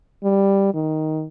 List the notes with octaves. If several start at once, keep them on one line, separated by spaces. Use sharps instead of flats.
G3
D#3